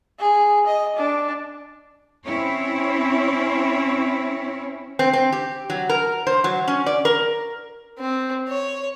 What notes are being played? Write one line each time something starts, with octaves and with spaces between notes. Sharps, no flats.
G#4
D#5
D4
C4 C#4 E4 C#5
C4
C4
G4
F#3
A#4
C5
F#3
C#4
D5
A#4
C4
C#5